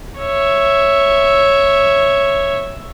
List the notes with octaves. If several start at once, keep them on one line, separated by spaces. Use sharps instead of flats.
C#5 E5